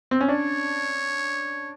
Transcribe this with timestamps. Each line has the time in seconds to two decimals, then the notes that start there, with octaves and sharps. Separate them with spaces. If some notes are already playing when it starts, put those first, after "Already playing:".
0.11 C4
0.21 C#4
0.28 D4 C#5